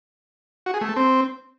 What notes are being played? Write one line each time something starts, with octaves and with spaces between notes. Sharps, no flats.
F#4
G#4
A3
A4
C4